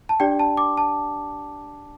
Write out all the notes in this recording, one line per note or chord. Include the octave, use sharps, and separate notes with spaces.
A5
D4 G4 D5 G5
A5
D6
A5